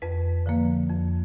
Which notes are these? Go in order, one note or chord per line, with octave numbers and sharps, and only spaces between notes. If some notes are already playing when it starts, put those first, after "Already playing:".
F2 B4
D3 F3 A#3
F2